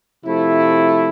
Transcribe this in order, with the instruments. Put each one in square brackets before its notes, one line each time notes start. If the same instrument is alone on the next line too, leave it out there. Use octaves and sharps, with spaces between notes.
[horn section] C3 F3 A3 E4